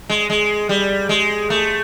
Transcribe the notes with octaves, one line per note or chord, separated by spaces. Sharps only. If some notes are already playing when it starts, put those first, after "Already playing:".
G#3
G#3
G3
G#3
A3